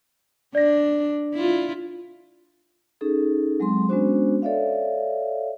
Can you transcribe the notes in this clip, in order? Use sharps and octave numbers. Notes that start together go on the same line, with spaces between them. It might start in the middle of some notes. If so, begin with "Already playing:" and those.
D4 D5 A#6
E4 F4
C#4 D#4 G#4 A4
F#3 G#3 C4 C6
G#3 B3 C#4 D4 F#4 C5
A4 C#5 D5 E5 F5